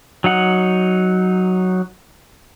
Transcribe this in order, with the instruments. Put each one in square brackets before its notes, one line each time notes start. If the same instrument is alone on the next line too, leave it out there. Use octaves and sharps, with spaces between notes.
[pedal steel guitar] F#3 D#4 F#5